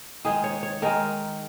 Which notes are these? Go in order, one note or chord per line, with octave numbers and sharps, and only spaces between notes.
D#3 G#3 G#4
C#5
C#5
D#3 G#3 A#4